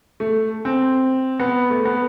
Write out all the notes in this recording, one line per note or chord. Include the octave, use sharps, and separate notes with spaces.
A3
C4
B3
A3
B3